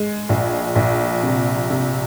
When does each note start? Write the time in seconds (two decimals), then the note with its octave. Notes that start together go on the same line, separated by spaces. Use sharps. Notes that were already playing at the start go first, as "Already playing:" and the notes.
Already playing: G#3
0.29 A#1
0.75 A#1
1.23 C3
1.70 C3